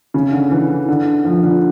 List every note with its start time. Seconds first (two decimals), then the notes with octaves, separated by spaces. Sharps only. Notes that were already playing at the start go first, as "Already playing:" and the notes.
0.14 C#3
0.32 D3
0.51 E3
0.88 D3
1.25 F3
1.43 D3